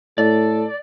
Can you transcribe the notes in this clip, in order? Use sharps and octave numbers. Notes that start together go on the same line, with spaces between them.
A2 A4 D5